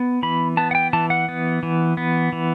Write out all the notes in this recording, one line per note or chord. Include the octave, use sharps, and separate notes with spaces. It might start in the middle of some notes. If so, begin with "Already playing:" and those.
Already playing: B3
E3 B5
B3 A5
F#5
G5
E3 A5
F#5
B3
E3
B3
E3